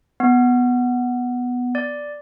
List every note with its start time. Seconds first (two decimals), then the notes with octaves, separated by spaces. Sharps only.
0.20 B3
1.75 D5